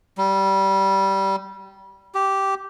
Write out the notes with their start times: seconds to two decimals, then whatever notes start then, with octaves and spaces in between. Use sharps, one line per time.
0.18 G3
2.15 G4